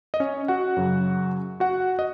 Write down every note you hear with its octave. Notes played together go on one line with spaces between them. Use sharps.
D#5
C#4 C#5
F#4 F#5
F#2 C#3 F#3
F#4 F#5
D#5